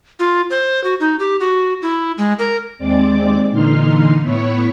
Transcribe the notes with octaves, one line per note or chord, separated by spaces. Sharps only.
F4
C5
F#4
D#4
G4
F#4
E4
G#3
A#4
D#2 G#3 C4 D5 D6
A#2 D3 E3 D#4 C6 F6
A2 B3 E4 C#5 B5 C#6